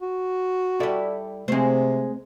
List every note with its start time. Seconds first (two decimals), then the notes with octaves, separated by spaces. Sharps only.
0.02 F#4
0.80 G3 E4 A4 D5
1.48 C3 G#3 A3 C4 C5